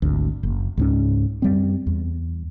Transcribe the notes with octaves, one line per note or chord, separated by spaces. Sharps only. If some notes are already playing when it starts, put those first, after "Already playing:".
G#1 D2
F#1
C#2 G#2 C#4
F#2 G3 C4
E2